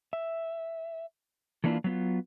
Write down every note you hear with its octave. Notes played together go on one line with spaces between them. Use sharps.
E5
E3 A3 A#3 D4 E4 F4
F#3 B3 F4